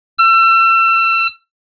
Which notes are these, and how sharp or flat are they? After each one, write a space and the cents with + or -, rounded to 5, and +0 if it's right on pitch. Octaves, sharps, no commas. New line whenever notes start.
E6 +35